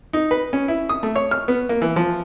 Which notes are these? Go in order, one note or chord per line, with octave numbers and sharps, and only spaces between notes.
D#4
B4
C#4
E4
D#6
A3
C#5
F6
B3
A#3
E3
F3